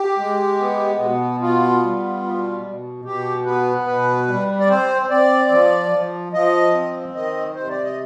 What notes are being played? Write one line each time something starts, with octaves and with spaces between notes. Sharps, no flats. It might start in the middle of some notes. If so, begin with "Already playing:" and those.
Already playing: G4
G#3
B3
B2
B3 F4
G3
B2
B2
B2 G4
B3 B4
B2 B4
G3
D5
C4 C5
C4 D5
F3
F3
F3 D#5
C4
D#3 D#5
C3 C5
D5
D#5